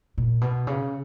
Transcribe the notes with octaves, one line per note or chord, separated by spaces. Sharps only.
A#2
B2
C#3